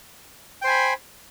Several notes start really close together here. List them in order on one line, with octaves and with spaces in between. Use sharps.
G5 C5 G#5 B5